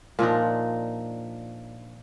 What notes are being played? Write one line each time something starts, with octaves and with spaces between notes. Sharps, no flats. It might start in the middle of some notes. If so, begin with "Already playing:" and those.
A#2 F3 D4 D#4